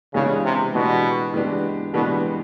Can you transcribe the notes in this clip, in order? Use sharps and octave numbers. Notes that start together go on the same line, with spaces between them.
C#3 E3 G#3 B3 D4 G4
C3
B2 E3 G#3 B3 D4 G4
E3 G#3 B3 D4 G4
B2 E3 G#3 B3 D4 G4